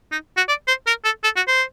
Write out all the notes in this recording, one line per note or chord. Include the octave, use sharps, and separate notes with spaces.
D#4
F#4
D5
C5
A#4
A4
A4
F#4
C5